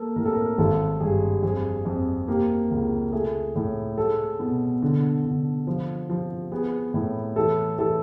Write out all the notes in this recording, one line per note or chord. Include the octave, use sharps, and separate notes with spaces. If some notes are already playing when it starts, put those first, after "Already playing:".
Already playing: A#3 A4
A2 A#4
A4
A#4
G#1 A4
G2 G#4
F2 G#4
F2
A#3 G4
C#2
A3 G#4
A2
G#3 A4
B2
D3
D3
F3
F3
B3 G#4
A2
E3 A4
E3 A4